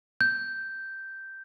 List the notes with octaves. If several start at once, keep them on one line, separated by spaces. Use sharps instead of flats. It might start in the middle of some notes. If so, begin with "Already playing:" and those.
G6